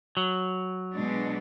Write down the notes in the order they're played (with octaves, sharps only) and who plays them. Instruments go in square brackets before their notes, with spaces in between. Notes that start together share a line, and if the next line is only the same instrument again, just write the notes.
[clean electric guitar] F#3
[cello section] B2 G#3 B3 D4